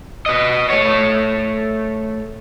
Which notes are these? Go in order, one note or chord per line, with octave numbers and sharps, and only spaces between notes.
B4 D#5
A3 C#5